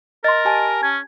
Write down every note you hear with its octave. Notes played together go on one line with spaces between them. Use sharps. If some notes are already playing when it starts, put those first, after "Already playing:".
A#4 D#5 C6 A6
G4 G#5 A5
C#4 G#6